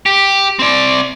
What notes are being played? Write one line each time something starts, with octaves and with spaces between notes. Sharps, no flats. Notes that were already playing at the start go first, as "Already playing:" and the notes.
G4
C4 D5